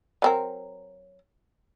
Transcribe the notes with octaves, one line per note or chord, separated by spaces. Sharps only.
F#3 C4 A#4